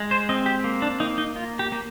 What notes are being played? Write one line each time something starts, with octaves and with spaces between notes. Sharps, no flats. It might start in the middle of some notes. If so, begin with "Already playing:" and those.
Already playing: G#3
C5
C4 D#5
G4
A#3
D4
A#3 D#4
D#4
A#3 F4
G4
A#3